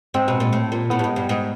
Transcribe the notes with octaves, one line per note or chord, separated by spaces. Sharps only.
G#2 C4
B2
A#2
A2
A#2
A2 B3
G2
G#2
G2
G#2